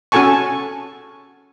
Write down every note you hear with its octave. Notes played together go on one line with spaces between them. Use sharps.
C#4 F#4 A4 G#5 A5 C#6